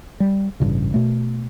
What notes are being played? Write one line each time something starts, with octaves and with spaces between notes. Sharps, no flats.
G3
A1 G2 A#2 C#3
B2 A3